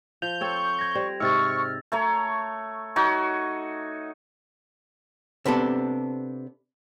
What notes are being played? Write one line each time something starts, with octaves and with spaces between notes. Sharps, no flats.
F3 G6 F7
C4 A4 C#5 C#6
G#6 A#6
G3 C5 D5
G#2 C3 C#6 E6 F6 A6
A3 C#5 A#5
D#4 F#4 C#5 D6
C3 B3 D4 A4